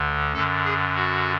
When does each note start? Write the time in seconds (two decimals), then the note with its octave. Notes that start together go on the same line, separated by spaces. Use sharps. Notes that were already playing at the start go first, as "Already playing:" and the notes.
Already playing: D2 D3
0.34 F#2 D3 A4
0.65 G#4
0.96 F#4